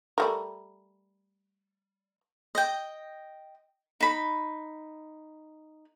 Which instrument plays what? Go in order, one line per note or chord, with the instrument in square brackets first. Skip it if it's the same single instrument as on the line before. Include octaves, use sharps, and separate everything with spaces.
[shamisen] G3 A3 A#4
[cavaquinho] D#5 G5
D#4 B5